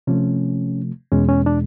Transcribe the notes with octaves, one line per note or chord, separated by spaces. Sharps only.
C3 F3 A3 C#4
E2 B2 G#3 C#4
C#4
D4